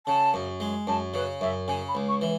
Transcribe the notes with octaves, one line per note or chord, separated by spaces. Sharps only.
C#3 A5
F#2
G#3
F#2 A5
C#3 B4
F#2 E5
C#3 G#5
B5
C#2
C#6
E3